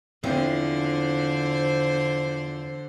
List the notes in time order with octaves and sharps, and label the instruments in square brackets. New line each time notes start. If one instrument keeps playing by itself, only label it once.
[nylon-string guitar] E2 F3 C4 [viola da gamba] D3 C5